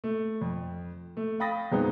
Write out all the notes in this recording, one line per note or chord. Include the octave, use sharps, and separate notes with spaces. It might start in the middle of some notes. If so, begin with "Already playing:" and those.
A3
F2
A3
F5 G5 B5 D#6 A6 A#6
F#2 G#3 B3 C4 D#4